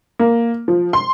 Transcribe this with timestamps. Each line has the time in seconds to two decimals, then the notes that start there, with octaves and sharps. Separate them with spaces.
0.19 A#3
0.68 F3
0.93 C6